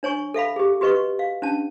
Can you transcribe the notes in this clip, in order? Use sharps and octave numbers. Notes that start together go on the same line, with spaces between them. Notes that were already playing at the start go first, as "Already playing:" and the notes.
D4 C#5 G#5 C#6
A4 E5 F5 B5
G4 G#4
F#4 G4 B4 D#5 C#6
F5
C#4 D4 A5